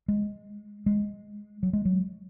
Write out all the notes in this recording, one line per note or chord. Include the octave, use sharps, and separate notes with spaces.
G#3
G#3
F#3
G#3
F#3